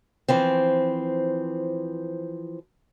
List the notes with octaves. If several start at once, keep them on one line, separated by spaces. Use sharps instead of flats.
E3 F3 C4